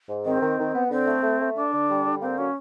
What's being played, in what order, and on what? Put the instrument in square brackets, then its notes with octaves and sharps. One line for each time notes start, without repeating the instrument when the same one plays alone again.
[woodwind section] G#2
[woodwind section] D#3 [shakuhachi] C4
[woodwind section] D#3
D#3
B3
[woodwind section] D3 [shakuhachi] C4
[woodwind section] A3
A3
A3
[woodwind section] D3 [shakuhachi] D4
[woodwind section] D3
G3
D3
[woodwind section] A#3 [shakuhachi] C4
[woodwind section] F#3 [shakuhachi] C#4